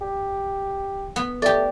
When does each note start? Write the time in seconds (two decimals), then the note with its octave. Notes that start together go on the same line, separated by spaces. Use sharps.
0.01 G4
1.16 B3
1.42 A3 G4 D5